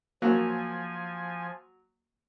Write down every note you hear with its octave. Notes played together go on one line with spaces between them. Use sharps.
F3 F#3 A#3 G#5